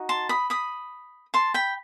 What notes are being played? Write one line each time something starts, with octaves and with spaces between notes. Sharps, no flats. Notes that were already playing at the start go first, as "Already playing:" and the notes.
Already playing: D#4 F#4
A5 C6
B5 D#6
B5 D#6
A5 C6
G5 B5